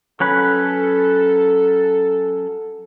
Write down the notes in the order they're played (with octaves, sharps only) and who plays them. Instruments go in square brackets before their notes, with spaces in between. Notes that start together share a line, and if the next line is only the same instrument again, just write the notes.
[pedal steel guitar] F#3 C#4 B4 [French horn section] A4